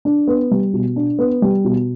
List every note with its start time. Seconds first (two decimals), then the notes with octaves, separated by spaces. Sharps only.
0.05 D4
0.27 B3
0.51 G3
0.74 B2
0.96 D4
1.19 B3
1.42 G3
1.65 B2